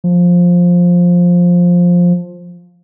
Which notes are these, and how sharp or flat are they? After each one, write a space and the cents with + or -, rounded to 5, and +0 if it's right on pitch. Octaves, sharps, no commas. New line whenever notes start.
F3 +10